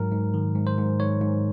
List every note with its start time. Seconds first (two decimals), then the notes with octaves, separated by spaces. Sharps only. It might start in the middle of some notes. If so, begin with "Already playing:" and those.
Already playing: G#2 F#3 A#4
0.11 G#2
0.34 D#3
0.55 G#2
0.67 C5
0.78 G#2
1.00 G#2 C#5
1.22 G#2